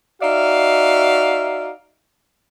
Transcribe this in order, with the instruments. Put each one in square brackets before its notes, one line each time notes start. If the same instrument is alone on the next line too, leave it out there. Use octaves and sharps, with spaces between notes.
[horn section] D#4 F#4 D5 E5 F5